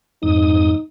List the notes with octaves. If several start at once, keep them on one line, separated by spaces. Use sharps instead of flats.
F2 G#2 D#4 D#6